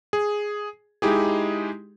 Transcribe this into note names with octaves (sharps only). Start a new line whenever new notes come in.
G#4
G#3 D#4 E4 G4 G#4